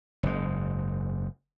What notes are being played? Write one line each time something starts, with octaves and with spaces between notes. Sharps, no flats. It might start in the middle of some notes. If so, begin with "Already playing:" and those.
F#1 G#2